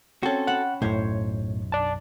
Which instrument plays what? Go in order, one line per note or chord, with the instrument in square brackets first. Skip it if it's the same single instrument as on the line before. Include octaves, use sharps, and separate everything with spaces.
[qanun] C4 C#4 [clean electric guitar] F#4 A4
[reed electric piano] F#5 [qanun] A5 B5
[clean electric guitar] B1 F#2 [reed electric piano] A2 [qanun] C5 C#5
[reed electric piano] D5 A5